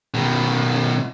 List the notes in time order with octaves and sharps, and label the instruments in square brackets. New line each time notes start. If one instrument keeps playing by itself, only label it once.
[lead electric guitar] B2 D#3